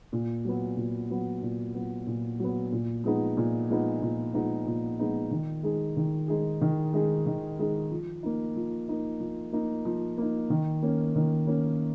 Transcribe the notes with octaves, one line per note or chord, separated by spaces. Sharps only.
A#2
F#3 B3
A#2
F#3 B3
A#2
F#3 B3
A#2
F#3 B3
A#2
F3 G#3 B3 D#4
A#2
F3 G#3 B3 D#4
A#2
F3 G#3 B3 D#4
A#2
F3 G#3 B3 D#4
D#3
G#3 D#4 G#4
D#3
G#3 D#4 G#4
D#3
G#3 D#4 G#4
D#3
G#3 D#4 G#4
F3
A#3 D#4
F3
A#3 D#4
F3
A#3 D#4
F3
A#3 D#4
D#3
A#3 C#4
D#3
A#3 C#4